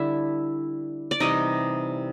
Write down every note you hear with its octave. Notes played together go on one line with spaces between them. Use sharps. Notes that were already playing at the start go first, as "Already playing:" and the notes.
Already playing: D3 G3 D4 E4 E5
D5
C3 E3 G3 D#4 D#5